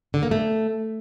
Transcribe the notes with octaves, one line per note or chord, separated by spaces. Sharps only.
D3
A#3
A3